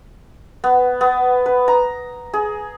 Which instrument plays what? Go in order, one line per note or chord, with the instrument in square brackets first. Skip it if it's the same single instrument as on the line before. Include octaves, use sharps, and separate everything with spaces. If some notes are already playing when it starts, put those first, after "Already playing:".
[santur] B3
B3
B4
A#5
G#4